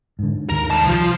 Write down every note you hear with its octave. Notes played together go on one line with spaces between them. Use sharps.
G#2 D3
D#2 D#3 A#4
G3 A5
C2 F3 F4